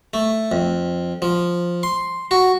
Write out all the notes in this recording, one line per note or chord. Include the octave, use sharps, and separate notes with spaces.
A3
F2
F3
C6
F#4